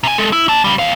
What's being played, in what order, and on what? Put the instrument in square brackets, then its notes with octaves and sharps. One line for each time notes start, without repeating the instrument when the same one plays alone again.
[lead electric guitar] C3 G#5
G#3 A4
E4
A#3 A5
C#3 G3
D#2 F5